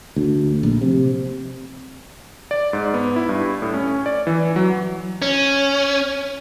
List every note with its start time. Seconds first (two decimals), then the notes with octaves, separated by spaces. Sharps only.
0.16 D2
0.63 A#1
0.81 C3
2.51 D5
2.73 G#2
2.94 B3
3.16 E4
3.29 G2
3.62 A2
3.74 C#4
4.06 D5
4.27 E3
4.56 F#3
5.22 C#4